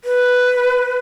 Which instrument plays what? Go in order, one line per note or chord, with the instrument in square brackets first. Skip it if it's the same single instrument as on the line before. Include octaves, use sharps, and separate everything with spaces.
[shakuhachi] B4